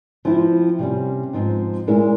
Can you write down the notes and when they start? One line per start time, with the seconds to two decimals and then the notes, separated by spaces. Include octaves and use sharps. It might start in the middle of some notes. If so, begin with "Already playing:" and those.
0.25 F3 C4 E4
0.79 C3 G3 C#4
1.33 G#2 F3 C4
1.87 A#2 G#3 C#4 E4 A#4